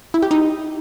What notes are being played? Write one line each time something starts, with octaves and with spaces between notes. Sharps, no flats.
E4
G4
D#4